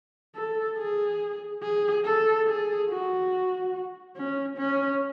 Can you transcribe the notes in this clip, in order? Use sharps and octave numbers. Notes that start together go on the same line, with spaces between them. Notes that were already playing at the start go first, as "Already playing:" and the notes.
A4
G#4
G#4
A4
G#4
F#4
C#4
C#4